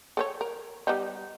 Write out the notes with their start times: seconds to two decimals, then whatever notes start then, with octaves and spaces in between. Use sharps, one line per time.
0.17 A4 B4 C#5
0.41 A#4
0.87 G3 B3 D#4